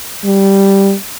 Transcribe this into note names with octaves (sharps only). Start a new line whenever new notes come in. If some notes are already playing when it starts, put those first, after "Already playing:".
G3